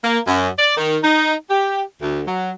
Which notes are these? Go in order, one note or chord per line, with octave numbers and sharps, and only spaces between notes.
A#3
F#2
D5
D#3
D#4
G4
D2
F#3